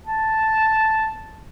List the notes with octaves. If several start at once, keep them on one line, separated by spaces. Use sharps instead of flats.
A5